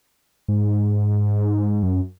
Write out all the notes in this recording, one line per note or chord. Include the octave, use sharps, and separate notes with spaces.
G#2
F#2